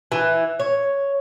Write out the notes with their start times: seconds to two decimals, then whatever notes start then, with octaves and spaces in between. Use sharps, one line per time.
0.12 E3
0.60 C#5